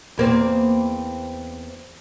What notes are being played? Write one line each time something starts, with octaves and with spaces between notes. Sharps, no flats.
E2 A#3 C4